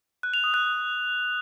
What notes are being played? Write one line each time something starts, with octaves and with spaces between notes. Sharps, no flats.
F#6
F7
D#6
F#6